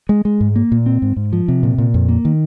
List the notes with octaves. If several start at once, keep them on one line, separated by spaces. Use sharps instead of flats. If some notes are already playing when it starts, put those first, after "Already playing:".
G#3
G#3
G#2
A#3
A#2
C4
G#2
G#2
F3
C3
A#2
A#2
F2
A#3
D#3